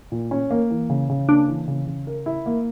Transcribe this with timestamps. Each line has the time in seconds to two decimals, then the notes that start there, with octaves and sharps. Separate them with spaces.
0.12 A#2
0.31 C#4
0.51 A#3
0.70 E3
0.90 C#3
1.10 C#3
1.29 A#3 D4
1.48 E3
1.68 C#3
1.87 C#3
2.07 A#4
2.26 E4
2.46 A#3